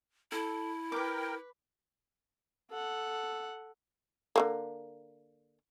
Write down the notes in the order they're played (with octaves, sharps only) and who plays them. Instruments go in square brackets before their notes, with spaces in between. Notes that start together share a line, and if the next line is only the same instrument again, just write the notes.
[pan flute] E4 [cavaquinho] A4
[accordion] A#4 G5 [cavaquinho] B4 D6
[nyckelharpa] A4 F#5
[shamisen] D3 A3 A#3